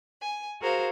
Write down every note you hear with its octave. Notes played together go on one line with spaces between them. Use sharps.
G#5
F#4 G#4 A#4 C5 F5